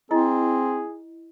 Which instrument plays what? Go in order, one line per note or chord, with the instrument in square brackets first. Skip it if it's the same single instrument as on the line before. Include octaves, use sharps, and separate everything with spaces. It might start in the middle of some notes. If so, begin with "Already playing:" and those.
[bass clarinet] C4 [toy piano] E4 D#5 [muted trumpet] G#4